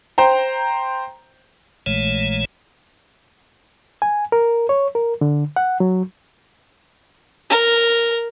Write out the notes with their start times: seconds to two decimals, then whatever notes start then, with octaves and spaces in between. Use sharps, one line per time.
0.18 C5 G5 A#5
1.86 A#1 A#2 E3 G#3 A3 C#5
4.02 G#5
4.32 A#4
4.69 C#5
4.95 A#4
5.21 D3
5.56 F#5
5.80 F#3
7.50 A#4